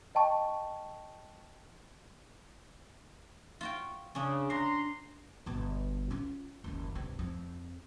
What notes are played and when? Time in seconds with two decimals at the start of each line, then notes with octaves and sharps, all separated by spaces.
0.15 D#5 G5 A5 C#6
3.61 F4 F#4 G5
4.15 C#3 C#4 D4
4.50 D4 A#5 C6
5.46 G1 B2
6.11 C#4 F4
6.64 F#1 D#2
6.95 G2 C3
7.19 F2